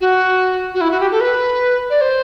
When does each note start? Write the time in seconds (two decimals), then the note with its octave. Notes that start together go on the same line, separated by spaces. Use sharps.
0.01 F#4
0.74 F#4
0.81 E4
0.91 F#4
1.00 G4
1.11 A4
1.21 B4
1.90 D5
2.01 C5